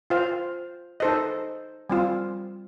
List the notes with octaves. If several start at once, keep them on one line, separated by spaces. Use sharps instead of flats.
F4 C5 F5
D#4 A4 C5 D#5
G3 C4 F4